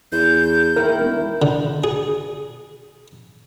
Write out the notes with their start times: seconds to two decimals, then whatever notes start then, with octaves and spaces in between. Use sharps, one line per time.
0.12 E2 G6
0.76 D#3 A#3 E4 A#4
0.99 E1
1.42 D3
1.84 G#4